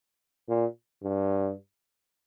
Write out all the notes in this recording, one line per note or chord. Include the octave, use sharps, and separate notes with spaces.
A#2
G2